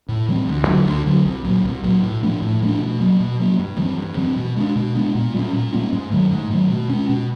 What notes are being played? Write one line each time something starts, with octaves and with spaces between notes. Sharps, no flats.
A2
E3 G3 C4
D2
D3 F#3
D2
D3 F#3
C2
A#2 F#3
C2
A#2 F#3
A2
F3 A3 D4
A2
F3 A3 D4
B2
F#3 A#3
B2
F#3 A#3
G2
E3 G3 C4
G2
E3 G3 C4
B2
G#3 B3 D4
B2
G#3 B3 D4
A#2
G3 A#3 C#4
A#2
G3 A#3 C#4
G#2
D#3 F#3 A3
G#2
D#3 F#3 A3
B2
G#3 C#4
B2